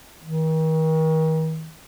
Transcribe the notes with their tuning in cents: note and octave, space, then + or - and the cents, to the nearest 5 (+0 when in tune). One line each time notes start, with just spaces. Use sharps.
D#3 +40